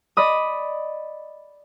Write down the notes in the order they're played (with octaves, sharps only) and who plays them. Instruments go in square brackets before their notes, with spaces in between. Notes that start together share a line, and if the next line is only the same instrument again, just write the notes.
[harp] D5 D#5 B5 D#6